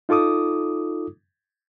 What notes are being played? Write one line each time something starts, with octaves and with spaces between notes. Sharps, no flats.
D#4 F4 A4 D6 D#6